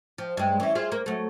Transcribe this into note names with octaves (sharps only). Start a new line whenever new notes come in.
F3
G2 G#3
E3 C#4
F4 G#4 C5
A#3
F#3 A3